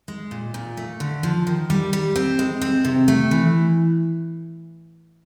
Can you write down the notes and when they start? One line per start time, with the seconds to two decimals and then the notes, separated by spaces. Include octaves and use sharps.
0.08 G#3
0.31 A#2
0.54 A#2
0.77 A3
1.00 D3
1.23 F3
1.47 D#3
1.70 G3
1.93 G3
2.16 C4
2.39 G#3
2.61 C4
2.85 C3
3.08 A3
3.31 E3